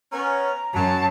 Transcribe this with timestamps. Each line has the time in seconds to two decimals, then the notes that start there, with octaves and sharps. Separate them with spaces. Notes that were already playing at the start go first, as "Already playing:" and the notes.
0.12 B3 C#4 A#5
0.74 F#2 F#3 A5